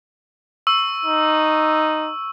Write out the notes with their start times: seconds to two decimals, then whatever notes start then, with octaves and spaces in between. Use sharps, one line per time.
0.67 C#6 E6
1.05 D#4